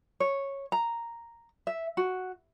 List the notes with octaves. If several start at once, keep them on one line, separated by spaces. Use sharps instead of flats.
C#5
A#5
E5
F#4